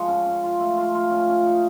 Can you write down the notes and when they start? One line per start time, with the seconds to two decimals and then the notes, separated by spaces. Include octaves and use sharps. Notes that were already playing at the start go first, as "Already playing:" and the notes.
Already playing: F3 G#3 C#6
0.08 C#4
0.26 C#4
0.43 F4
0.60 A3
0.77 F4 A5
0.95 F4
1.11 C#4
1.29 C#4
1.46 D#4